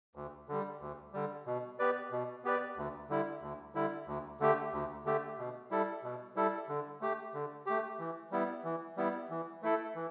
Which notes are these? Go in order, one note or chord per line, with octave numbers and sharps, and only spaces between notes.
D2
D3 G3
D2
D3 G3
B2
B3 G4 B4 D5
B2
B3 G4 B4 D5
D2
D3 G3 E4
D2
D3 G3 E4
D2
D3 A3 G4
D2
D3 A3 G4
B2
G3 E4 A4
B2
G3 E4 A4
D3
A3 G4
D3
A3 G4
E3
G3 B3 E4
E3
G3 B3 E4
E3
A3 E4 A4
E3